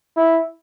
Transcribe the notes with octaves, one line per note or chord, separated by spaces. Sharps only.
E4